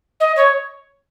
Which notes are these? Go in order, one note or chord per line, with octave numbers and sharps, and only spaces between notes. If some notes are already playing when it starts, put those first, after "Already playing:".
D#5
C#5